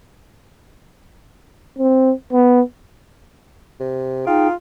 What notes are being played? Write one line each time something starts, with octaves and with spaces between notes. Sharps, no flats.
C4
B3
C3
D#4 F4 G#4 G5